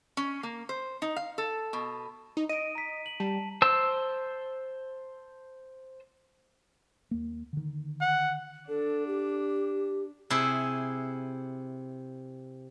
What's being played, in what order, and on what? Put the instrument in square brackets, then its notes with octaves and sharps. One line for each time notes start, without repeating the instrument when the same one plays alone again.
[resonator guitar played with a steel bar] C#4
A#3
C5
D#4
F5
A4
B2
[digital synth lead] D#4
[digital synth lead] D#5 [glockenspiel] D7 D#7
[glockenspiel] A#5 B6
F#7
[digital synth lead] G3 [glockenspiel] A5
[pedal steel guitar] C5 A5 E6
[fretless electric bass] D#2 A#3
D3 D#3
[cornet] F#5
[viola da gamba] D4 [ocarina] A4
[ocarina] G4
[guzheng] C3 E4 G#4